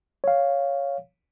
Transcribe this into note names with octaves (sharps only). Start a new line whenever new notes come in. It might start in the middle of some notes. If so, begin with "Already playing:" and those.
C#5 F5